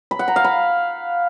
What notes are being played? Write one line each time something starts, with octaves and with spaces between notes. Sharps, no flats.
B5
F#5
A#5
F5
B5